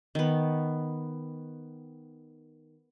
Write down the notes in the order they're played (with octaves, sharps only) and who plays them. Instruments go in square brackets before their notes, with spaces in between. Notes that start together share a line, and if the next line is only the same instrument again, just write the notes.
[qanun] D#3 B3